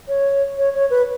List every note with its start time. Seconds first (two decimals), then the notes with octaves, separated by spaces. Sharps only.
0.08 C#5
0.58 C#5
0.74 C#5
0.90 B4